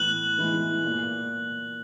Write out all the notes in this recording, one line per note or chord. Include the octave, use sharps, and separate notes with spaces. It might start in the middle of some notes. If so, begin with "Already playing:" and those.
Already playing: A2 E3 B3 F#6 F#7
E3 G#3 B3 E4
A#2